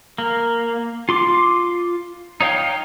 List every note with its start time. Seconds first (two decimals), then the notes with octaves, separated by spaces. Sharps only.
0.18 A#3
1.09 F4 C6 D6
2.41 D#4 C#5 F5 G5